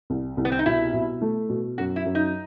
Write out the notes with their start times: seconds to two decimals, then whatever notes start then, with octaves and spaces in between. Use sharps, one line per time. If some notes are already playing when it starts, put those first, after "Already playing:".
0.10 C2
0.37 C2
0.45 B3
0.52 C4
0.59 D#4
0.66 B2 E4
0.93 B2
1.21 A3
1.49 B2
1.78 F#2 F#4
1.96 E4
2.05 F#2
2.15 D#4